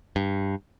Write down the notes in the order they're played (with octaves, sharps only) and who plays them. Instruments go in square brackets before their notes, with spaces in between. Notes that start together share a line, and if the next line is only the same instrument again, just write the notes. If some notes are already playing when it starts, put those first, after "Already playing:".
[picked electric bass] G2